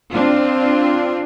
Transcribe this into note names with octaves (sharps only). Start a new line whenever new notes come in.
C4 D4 F4